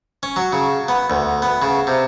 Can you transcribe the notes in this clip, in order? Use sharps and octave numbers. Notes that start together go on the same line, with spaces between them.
C#4
F#3
C#3
B3
D2
B3
C#3
C3